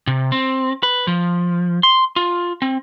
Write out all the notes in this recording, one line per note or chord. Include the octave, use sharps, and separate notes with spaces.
C3
C4
B4
F3
C6
F4
C4